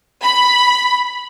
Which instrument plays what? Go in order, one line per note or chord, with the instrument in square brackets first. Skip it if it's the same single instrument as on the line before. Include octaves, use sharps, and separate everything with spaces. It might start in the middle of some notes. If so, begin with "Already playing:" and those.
[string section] B5